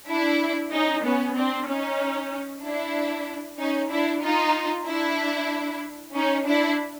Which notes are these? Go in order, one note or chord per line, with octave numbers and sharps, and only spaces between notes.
D4 E4
C#4 D#4
B3 C#4
C4 D4
C#4 D#4
D4 E4
C#4 D#4
D4 E4
D#4 F4
D4 E4
C#4 D#4
D4 E4